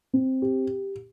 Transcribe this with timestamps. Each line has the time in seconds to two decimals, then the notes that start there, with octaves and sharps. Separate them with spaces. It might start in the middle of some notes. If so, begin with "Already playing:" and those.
0.13 C4
0.42 G4